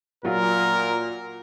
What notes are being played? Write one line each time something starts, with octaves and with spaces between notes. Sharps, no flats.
A#2 F#3 F4 A#4